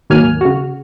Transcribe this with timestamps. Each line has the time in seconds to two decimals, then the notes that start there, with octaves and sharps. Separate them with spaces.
0.10 D#2 G#2 F#3 A#3 G#5 F6
0.41 C#3 F#4